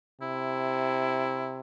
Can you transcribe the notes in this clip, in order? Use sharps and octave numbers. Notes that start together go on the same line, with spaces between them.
C3 E4